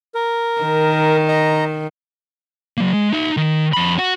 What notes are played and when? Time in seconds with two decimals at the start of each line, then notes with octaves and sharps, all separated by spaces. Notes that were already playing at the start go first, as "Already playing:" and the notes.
0.15 A#4
0.61 D#3
1.28 D#5 A#5
2.77 F#3 A#3
2.93 G#3
3.13 D#4 E5
3.37 D#3
3.73 F2 B5
3.98 F#4